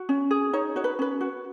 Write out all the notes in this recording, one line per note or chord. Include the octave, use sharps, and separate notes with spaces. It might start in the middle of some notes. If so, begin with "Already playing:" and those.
Already playing: F#4
C#4
G#4
D#4 C#5
F#4 C#5
B4
C#4 B4
F#4